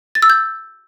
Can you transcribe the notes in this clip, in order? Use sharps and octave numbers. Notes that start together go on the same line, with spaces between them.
A6
E6
G6